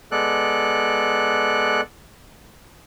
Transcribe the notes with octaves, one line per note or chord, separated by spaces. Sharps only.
G#3 B3 A4 D5 F#6